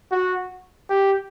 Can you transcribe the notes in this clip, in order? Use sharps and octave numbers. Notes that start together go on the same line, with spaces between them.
F#4
G4